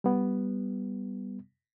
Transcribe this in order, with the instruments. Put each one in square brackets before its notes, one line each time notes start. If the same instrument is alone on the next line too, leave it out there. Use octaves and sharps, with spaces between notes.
[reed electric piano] G3 B3